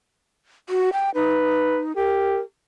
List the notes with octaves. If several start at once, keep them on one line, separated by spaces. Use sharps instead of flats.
F#4
G5
D#4 B4
G4 A#4